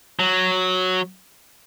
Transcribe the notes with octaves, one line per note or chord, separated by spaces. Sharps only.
F#3